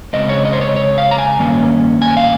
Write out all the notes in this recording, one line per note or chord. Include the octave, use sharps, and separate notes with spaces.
C#3 G#3 C4 D#5
C#5
D#5
C5
C#5
C#5
F5
A#5
G#5
G2 D#3 A#3 C#4
G#5
F5